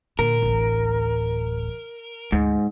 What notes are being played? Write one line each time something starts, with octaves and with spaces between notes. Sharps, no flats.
A#2 D3 A#4
D1 A1
D2 G#2